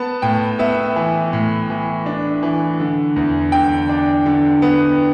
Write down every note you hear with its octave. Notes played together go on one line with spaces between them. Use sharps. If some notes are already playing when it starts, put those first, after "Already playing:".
Already playing: B3 A5
A2 G5
B3 E5
E3
A2
E3
D4
E3
D3
E2
D3 G5
D4
D3
B3